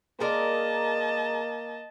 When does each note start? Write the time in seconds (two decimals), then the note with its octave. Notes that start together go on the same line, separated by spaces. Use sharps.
0.20 G#3 A#3 A#4 D5 D#5 A5